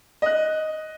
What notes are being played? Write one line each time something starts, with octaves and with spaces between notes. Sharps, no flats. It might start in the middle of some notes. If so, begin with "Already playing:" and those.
D#5 F#6